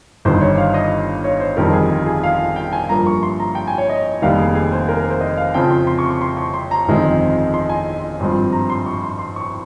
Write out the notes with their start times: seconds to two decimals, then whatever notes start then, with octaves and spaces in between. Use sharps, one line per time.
0.25 G1 G2 D#3 C5
0.41 C#5
0.58 F5
0.74 D#5
1.24 C#5
1.40 C5
1.57 G1 F2 D#3 G3 A#4
1.73 G#4
2.06 G#4
2.23 F5
2.56 G5
2.73 G#5
2.89 G2 F3 A#3 A#5
3.07 C#6
3.23 C6
3.40 A#5
3.55 G5
3.67 G#5
3.78 C#5
3.90 D#5
4.22 F1 D#2 D#3 G3 F5
4.39 G#4
4.55 G#4
4.72 C5
4.89 A#4
4.99 A#4
5.10 C5
5.21 D#5
5.37 F5
5.54 F2 C#3 F3 C4 G5
5.71 C6
5.87 C6
5.99 C#6
6.10 C#6
6.21 C6
6.37 C#6
6.54 C6
6.71 A#5
6.88 G1 F2 D#3 G#3 C4
7.54 C6
7.69 G#5
8.20 G#1 G2 F3 C4
8.53 A#5
8.70 C6
8.86 C#6
9.03 C6
9.19 C6
9.36 C#6